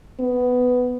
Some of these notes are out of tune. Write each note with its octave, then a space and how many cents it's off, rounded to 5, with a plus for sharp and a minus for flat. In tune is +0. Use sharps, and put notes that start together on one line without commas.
B3 +10